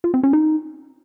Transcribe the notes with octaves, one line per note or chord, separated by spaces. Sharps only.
F4
C4
C#4
D#4